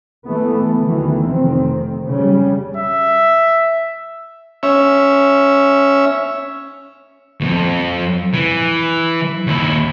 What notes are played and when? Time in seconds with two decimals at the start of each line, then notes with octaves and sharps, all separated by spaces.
0.25 E3 A3 B3
0.79 D2 D#3 E3
1.25 F1 D#3 C4
2.08 C#3 G3
2.77 E5
4.63 C#4 E5
7.41 C2 F2
8.34 E3
9.47 D#2 E4